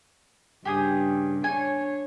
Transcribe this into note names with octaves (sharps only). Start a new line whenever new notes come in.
G2 C#3 G4 G#4 D#6
D4 C#5 G#5